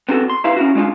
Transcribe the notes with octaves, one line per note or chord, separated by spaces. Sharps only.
B3 C4 D4 F4 F#4 A4
C6
D#4 E4 G4 B4 E5 F5
C#4 E4 F#4
G#3 D4 D#4 F4 F5